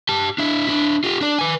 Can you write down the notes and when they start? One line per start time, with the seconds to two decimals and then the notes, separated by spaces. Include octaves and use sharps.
0.09 G4 A5
0.38 D4 E4
0.69 D4 E4
1.04 F4 G4
1.21 D4 D5
1.39 B4 G#5